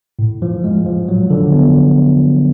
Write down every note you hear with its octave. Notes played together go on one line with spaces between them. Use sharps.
A2
F3
G#3
F3
F#3
D3
B3